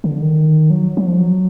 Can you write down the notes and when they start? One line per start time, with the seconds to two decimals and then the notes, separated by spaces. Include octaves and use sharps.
0.04 D3
0.21 D#3
0.70 F#3
0.97 F#3
1.07 F3
1.18 F#3